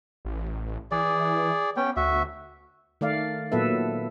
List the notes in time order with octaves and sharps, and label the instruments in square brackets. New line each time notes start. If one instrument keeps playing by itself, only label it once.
[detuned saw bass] A1
[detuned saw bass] E3 [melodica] G#4 D5
[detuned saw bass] B3 [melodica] C#4 G5
[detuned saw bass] D2 [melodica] F#4 E5
[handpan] D#3 A3 D5 F5
A#2 F#3 B3 A4 B4 E5